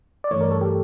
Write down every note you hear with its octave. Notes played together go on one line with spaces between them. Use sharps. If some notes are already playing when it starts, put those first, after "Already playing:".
D5
G2 E3 A3 C#5
A#4
A4
G4